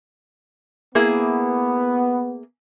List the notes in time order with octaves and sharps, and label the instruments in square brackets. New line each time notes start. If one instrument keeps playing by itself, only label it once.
[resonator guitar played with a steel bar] A#3 E4 G#4 [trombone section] B3